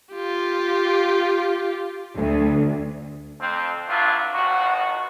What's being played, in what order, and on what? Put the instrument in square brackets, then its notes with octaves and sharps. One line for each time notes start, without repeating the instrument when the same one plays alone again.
[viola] F4 G4
[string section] D2
[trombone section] F2 C4
G2 F#3 D4 E4 F4
G#1 B2 F3 F#4